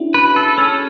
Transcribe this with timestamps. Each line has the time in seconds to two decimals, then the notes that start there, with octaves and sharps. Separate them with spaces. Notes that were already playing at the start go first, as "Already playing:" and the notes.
Already playing: C#4 D4 E4 F#4 G#4
0.14 B4
0.36 A4
0.58 C#4